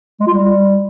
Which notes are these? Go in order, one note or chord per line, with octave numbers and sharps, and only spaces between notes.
G#3
F4
G3